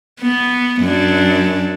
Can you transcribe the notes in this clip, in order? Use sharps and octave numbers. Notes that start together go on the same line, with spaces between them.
B3
F#2 D4